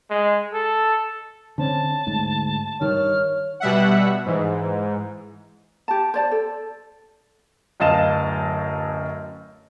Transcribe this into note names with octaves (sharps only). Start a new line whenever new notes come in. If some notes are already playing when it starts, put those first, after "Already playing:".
G#3
A4
D3 C4 C#4 A5
D2 G#2
G2 D#3 C#5 F6
B2 G3 E5 F#5
G#2 E3
G4 A5
C5 D5 A5
A4
D1 F#2 D#5 F5 A5 E7